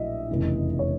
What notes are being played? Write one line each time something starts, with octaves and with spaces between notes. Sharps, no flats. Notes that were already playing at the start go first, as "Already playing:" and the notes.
Already playing: A#1 A2 F#3 D#5 E5
F1 E2 C#3 E3
C#5